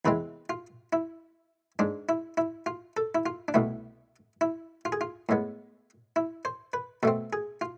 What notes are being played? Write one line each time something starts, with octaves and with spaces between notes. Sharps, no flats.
E2 C3 E3 G#3 C4 B4
F4
E4
G#2 G#3 D4
E4
E4
F4
A4
E4
F4
D4
C2 B2 A3 E4
E4
F4
G#4
F4
A2 G#3 B3
E4
C5
B4
B2 A3 C4 A4
G#4
F4